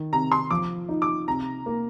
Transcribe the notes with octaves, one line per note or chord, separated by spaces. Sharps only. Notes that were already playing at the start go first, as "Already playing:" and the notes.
Already playing: D#3
C3 A#5
C6
F3 D6
D#4
D6
C3 A#5
A#3